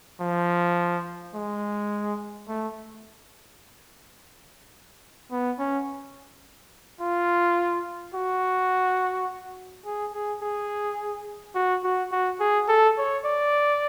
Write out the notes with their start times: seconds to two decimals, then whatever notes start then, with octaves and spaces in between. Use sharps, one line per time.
0.21 F3
1.35 G#3
2.48 A3
5.31 B3
5.59 C#4
7.01 F4
8.14 F#4
9.85 G#4
10.13 G#4
10.42 G#4
11.55 F#4
11.84 F#4
12.12 F#4
12.40 G#4
12.68 A4
12.98 C#5
13.25 D5